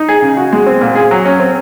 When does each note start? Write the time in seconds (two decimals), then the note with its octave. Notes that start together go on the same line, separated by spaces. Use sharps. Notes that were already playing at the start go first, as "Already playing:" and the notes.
Already playing: D#4
0.08 G#4
0.22 C#3
0.37 F#4
0.53 G#3
0.67 C4
0.81 A#2
0.95 G#4
1.11 F#3
1.25 C#4
1.40 C4